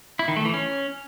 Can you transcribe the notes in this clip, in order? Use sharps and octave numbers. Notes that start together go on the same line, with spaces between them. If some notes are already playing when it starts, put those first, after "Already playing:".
E4
D#3
A3
E3
C#4